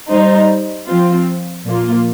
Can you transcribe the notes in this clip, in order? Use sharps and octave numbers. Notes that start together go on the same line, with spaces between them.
G3 D#4 C5
F3 C4 F4
A#2 F3 A#3 F4